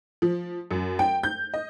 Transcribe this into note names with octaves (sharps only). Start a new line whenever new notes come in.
F3
F#2
G5
G6
D#5